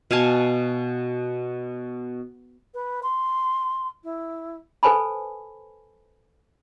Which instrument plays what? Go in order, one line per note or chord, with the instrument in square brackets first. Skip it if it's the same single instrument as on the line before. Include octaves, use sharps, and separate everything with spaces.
[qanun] B2 F5 G#5 A5
[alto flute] B4
C6
E4
[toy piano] A4 B4 C5 G#5 A5 B5